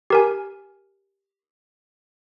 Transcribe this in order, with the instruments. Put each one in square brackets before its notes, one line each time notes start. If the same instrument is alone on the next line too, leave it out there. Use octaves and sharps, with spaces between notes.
[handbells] G4 A#4 G#5